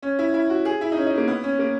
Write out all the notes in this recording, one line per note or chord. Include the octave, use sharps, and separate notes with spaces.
C#4
E4
E4
F#4
G#4
E4
D#4
C#4
D#4
A#3
B3
C#4
A#3